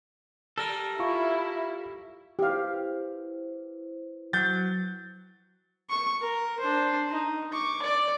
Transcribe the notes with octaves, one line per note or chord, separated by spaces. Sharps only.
G3 A4 A#4
E4 F4 F5 C#6
E4 G4 B4 C5 F5
F#3 G6 A6
C#6
A#4
D4 C5
D#4
C#6 D6
D5